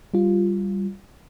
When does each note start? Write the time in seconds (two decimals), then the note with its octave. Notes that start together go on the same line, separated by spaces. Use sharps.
0.14 G3 F4